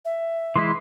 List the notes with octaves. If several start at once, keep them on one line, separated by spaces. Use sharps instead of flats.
E5
E3 G#3 E4 C6